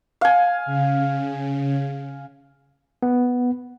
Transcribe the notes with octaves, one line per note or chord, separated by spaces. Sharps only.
F5 G#5
C#3
B3